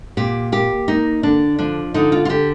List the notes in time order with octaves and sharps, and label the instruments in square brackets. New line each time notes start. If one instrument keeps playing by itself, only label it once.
[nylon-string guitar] A#2 G4
A#3 G4
A#3 D#4
D3 D4
F3 D4
D3 D#4
F4
F4
D3 G4